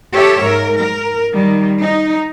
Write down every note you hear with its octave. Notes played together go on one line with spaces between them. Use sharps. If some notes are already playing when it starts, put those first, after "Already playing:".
G4 A4 C#5 E5
G#2 A#4
A#4
D#3 G3
D#4